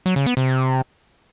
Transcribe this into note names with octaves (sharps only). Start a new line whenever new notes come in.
F#3
C#3
B3
C3